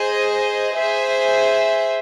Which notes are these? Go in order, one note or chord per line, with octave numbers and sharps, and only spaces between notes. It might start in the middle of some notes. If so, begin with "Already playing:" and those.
Already playing: G#4 C5 D#5
G#4 C5 E5